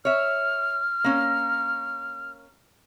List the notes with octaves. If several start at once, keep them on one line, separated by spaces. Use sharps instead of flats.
C#5 E5 F6
A#3 C#4